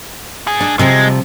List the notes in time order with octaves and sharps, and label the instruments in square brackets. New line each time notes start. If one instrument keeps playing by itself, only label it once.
[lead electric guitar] G#2 G#4
[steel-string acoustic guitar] D4
[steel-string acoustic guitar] C3 F3 G3 [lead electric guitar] G#3